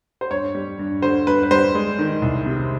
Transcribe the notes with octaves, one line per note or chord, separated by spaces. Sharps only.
C5
G2 C#5
G3
G2
D3 C5
G2 B4
B4
G3 C5
G#3
D#3
C2
C3